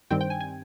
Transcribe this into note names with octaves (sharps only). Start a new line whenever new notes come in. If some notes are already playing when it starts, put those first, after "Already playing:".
G2 D#3 G3 C4 G5
G5
G#5
G#5